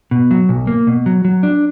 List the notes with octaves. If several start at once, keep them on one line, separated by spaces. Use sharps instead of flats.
B2
F#3
B1
A#3
B2
F#3
F#3
D4